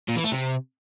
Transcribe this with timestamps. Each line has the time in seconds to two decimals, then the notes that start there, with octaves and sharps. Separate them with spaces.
0.09 A#2
0.16 E3
0.24 A3
0.32 C3